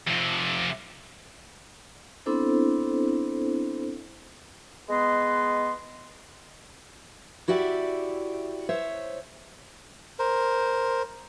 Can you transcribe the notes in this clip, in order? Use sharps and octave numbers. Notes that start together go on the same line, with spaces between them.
F2 C3
B3 C4 D4 E4 A4 C5
G#3 B3 B4 D#5 C6
E4 F#4 G4 D5 E5
C5 C#5 E5
A#4 C5